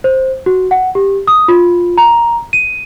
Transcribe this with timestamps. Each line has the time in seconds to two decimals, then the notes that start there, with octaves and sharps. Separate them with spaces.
0.04 C5
0.46 F#4
0.71 F#5
0.95 G4
1.27 D#6
1.48 F4
1.98 A#5
2.53 D#7